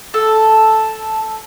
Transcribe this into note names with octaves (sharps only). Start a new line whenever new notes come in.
A4